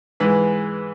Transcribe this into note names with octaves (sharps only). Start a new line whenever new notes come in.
G#2 E3 G#3 B4